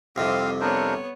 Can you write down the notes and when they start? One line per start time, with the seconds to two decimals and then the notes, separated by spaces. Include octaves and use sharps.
0.16 C2 F2 C3 C4 D#4 C5 F5
0.61 B3 D4 A#4 C5 C#5